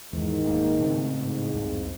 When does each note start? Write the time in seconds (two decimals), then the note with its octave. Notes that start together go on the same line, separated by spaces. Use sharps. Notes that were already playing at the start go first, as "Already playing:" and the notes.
0.13 E2 G#2 D#3
0.43 D#1 A#3
0.79 A2 C#3 C4
1.19 G#2
1.54 C2 F2